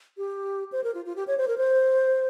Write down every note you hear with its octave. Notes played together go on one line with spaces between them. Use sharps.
G4
C5
A#4
F4
F4
G4
C#5
C5
A#4
C5